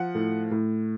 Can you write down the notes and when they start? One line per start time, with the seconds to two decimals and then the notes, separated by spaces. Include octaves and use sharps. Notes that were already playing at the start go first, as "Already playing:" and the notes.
Already playing: F3 F#5
0.15 A2
0.51 A2